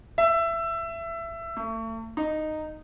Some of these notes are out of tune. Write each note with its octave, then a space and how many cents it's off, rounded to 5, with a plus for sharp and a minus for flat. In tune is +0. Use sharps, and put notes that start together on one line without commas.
E5 +20
A3 +35
D#4 -10